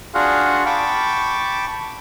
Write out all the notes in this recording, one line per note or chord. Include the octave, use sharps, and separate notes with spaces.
D4 F4 F#4 G#4 F5 F#5
G5 A5 B5 C#6 D6